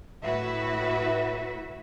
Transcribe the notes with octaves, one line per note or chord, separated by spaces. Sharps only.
A2 E4 F#4 B4 E5